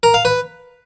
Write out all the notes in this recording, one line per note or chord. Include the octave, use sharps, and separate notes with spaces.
A#4
F5
B4